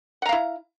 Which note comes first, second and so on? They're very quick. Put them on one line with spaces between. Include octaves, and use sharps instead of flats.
F#5 A#5 F5 E4